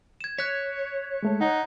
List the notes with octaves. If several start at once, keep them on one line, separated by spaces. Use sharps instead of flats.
G#6 E7
C#5 F#6 B6
G#3 A3 A4
D#4 F#5 A#5